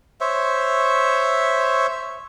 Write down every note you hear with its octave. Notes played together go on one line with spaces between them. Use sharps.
C5 C#5 E5